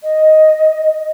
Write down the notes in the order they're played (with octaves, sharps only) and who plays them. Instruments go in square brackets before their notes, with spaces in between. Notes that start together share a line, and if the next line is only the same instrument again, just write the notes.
[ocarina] D#5